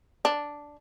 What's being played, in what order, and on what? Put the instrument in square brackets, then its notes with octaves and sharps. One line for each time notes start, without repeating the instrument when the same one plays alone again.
[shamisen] D4